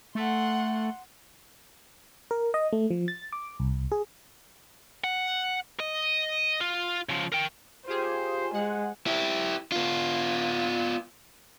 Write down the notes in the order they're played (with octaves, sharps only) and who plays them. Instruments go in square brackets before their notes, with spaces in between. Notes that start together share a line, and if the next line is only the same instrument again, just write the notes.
[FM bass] A3 [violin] F#5 C6
[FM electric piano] A#4
D#5
A3
F3
A6
D6
C2
G#4
[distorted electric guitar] F#5
D#5
F4
C#3 F3
A#4 G5
[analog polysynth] F4 G4 G#4 [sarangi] C5
[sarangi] G#3 [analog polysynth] F#5
[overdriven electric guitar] E4 G4
B3 F4